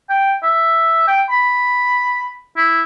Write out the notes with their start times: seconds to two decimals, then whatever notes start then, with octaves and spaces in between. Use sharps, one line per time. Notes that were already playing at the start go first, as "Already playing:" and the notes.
0.10 G5
0.43 E5
1.08 G5
1.30 B5
2.57 E4